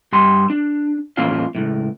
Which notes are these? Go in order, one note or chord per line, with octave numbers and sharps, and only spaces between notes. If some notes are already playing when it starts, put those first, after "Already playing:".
G2 G4 C6
D4
E2 A2 A#3 C#4 F4 F5
C#2 F#2 A2